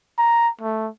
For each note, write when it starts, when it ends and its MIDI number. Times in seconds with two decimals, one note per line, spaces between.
0.18 0.49 82
0.61 0.89 57